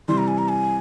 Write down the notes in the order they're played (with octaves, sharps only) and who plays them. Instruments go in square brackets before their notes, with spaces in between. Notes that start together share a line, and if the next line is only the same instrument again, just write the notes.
[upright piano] C3 E3 G3 [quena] C6
[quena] A#5
G#5
A#5
G#5